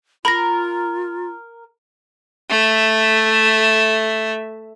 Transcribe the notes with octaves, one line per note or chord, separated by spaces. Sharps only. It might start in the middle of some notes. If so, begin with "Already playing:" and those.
F4 A#4 B5 A#6
A3 E5